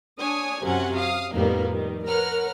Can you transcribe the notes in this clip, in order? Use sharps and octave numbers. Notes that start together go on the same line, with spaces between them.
D4 C#5 G#5 D#6
F#2 C3 F#3 C#4 F#5 G#5
F5 D#6
F2 A2 D#3 G3 A#3 B3
D#3 G3
A#4 B4 C#5 F#5 A#5 F6